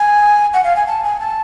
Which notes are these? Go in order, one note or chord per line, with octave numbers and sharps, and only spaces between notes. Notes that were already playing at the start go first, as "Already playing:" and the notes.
Already playing: G#5
F#5
F5
G#5
A5
G#5
A5